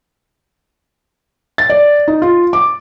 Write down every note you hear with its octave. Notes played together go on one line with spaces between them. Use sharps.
A6
D5
D#4
F4
D6